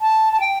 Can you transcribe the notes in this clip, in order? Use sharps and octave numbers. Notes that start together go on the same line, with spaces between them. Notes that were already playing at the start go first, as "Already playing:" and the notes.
A5
A5
G5